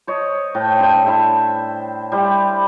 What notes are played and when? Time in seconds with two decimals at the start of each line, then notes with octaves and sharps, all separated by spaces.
0.07 C5 C#5 D#5
0.55 A2 G5
0.79 D4 C5 E5
1.05 E4 A4 C5 E5
2.12 G3 E4 C5 C6